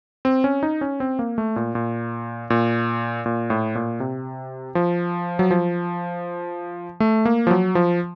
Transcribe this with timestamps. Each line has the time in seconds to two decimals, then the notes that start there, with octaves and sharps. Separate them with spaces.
0.25 C4
0.44 C#4
0.63 D#4
0.81 C#4
1.00 C4
1.19 A#3
1.38 A3
1.56 A#2
1.75 A#2
2.50 A#2
3.26 A#2
3.50 A2
3.75 A#2
4.00 C3
4.75 F3
5.39 F#3
5.51 F3
7.00 A3
7.25 A#3
7.47 F3
7.51 F#3
7.75 F3